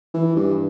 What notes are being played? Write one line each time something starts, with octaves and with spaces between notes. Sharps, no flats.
E3
G2